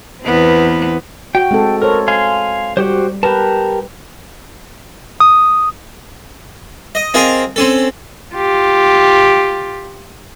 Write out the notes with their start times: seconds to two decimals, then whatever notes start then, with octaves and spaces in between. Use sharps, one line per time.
0.23 E2 B3 C4
1.35 F#4 G5
1.51 G#3 C4 A4
1.82 A4 A#4 C5 C#5
2.08 F5 G#5 C6
2.77 G3 F#4 G4 C5
3.23 G4 A#4 B4 A5
5.20 D#6
6.95 D#5
7.14 C4 F4 G#4 A#4 D#5
7.56 C4 C#4 A4
8.35 F4 G4